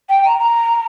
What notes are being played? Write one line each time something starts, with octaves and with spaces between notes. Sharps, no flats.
G5
A#5
A#5